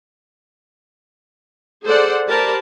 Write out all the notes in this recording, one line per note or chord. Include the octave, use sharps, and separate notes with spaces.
G#4 A4 C5 D5 F#5
G4 A#4 C5 D5 A5 B5